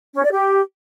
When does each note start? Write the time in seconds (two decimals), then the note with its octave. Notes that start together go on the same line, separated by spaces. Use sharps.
0.14 C#4
0.23 D5
0.32 G4